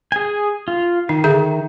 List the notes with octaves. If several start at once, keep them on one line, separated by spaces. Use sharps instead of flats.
G#4 G#5
F4
D#3 D#4
D3 G#4 E5